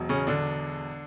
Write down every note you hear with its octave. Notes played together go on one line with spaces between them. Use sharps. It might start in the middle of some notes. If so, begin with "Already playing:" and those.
Already playing: E1 E2 F#3
C#3 C#4
D3 D4